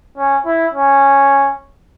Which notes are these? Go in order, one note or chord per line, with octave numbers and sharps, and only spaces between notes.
C#4
E4
C#4